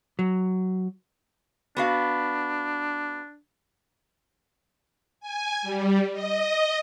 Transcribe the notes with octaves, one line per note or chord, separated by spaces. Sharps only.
F#3
B3 D4 F#4 F5
G#5
G3
D#5